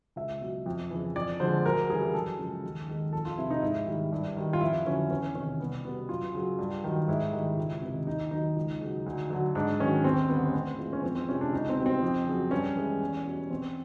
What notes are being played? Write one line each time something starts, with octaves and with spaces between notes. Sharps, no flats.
C#2 E5
B2 F#3
F2
C#3 E3
F2 D5
D3 F3 G#3 C5
D2 A#4
C#3 E3 G3 G#4
F#2 A4
C#3 F3 G#3
D#2
D#3 G#3
F2 A4
F4
C3 F3 E4
D#4
G#2 E4
D#3 G3
G2
D#3 G3
F4
F2 E4
D3 F#3 C#4
E2 C#4
C3 D#3 C#4
C2 B3
B2 G3 B3
F#2 F4
C#3 F#3
G2
D#3 F#3
G#2 E4
D#3 G3
C#2
C3 D#3
D#2 D#4
D#3 F#3 D#4
C#2
C#3 F#3
D2
D3 F#3
G#2 D4
D#3 F#3 C#4
D#2 C4
D3 G3 B3
C#4
A2 C4
E3 G#3 F4
C#4
F2 C4
C4
C3 F3 G#3 C#4
D4
C#2 D#4
C4
B2 G3
C4
F2
C#3 F#3
G2 C#4
E3 G#3
E2
B2 G3
E2 C4